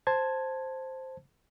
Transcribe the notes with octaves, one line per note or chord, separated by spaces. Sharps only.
C5 A5 G#6